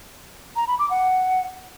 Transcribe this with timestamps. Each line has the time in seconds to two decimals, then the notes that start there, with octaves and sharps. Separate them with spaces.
0.56 A#5
0.68 B5
0.79 D6
0.90 F#5